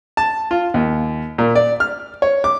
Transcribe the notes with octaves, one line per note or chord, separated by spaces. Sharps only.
A5
F4
D#2
A#2
D5
F6
C#5
D6